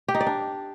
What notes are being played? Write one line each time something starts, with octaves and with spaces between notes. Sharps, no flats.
G4
D#4
D5
D4